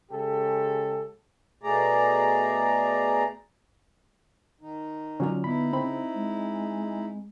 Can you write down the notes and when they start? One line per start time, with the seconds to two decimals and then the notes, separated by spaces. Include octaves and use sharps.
0.10 C#3 G#3 G4 A4
1.63 B2 A3 G#4 D5 A#5
4.61 D#3 D#4
5.20 D3 F#3 C#4 F4
5.44 B3 D#4 E4 B5
5.73 C#3 C4 B5
6.14 G#3